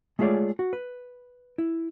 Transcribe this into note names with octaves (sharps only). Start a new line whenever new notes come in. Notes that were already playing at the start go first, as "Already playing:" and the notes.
G#3 A3 F4 G#4 C#5 D5
F#4
B4
E4